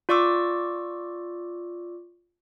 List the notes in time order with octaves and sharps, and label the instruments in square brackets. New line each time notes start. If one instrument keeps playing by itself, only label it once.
[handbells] F4 D5 C#6 D6 E6